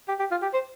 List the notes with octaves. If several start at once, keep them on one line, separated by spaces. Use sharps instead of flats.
G4
G4
F4
G4
C5